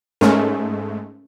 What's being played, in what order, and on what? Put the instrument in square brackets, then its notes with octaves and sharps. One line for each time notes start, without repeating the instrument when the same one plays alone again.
[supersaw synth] G#2 G#3 A3 [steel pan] C#4 A#4